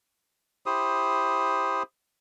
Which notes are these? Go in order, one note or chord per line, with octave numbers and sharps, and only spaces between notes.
E4 G4 C5 D#6